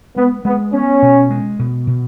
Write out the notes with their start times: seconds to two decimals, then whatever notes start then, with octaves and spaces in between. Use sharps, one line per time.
0.16 G#3 B3
0.45 G#3 B3
0.73 B3 C#4
1.02 B2
1.31 G#3
1.59 B2
1.87 B2